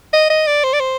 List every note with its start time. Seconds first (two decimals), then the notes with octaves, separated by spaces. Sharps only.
0.14 D#5
0.30 D#5
0.47 D5
0.64 C5
0.73 D5
0.80 C5